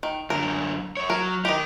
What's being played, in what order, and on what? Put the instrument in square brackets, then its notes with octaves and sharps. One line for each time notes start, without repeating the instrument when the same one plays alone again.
[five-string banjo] D#3
[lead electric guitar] F#2 D3 [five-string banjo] A#4
[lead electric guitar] F#2 C#5
[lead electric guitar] F#3 [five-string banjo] A#4
[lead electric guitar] D#4 A#4 [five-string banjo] G4 D#5